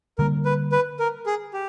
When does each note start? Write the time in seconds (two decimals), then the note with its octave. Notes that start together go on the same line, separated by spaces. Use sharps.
0.18 D3 G3 A#3 A#4
0.45 B4
0.72 B4
0.99 A#4
1.26 G#4
1.53 G4